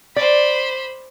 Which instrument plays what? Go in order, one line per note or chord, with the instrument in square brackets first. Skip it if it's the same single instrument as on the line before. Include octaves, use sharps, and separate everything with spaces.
[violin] C5 B5 [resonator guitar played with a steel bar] D5